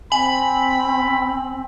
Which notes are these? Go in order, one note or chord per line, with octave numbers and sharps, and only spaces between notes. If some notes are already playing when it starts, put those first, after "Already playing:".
C4 G#5 B5 F#7